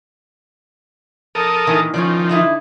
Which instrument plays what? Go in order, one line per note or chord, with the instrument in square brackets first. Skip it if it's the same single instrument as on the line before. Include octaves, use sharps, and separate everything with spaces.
[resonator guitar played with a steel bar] F2 [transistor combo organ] A4 A#4 D#6
[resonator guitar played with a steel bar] A#2 D#3 E3
[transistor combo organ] D#3 F3 [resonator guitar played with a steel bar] C#4 C5 D5
[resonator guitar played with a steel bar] D3 D#4 E4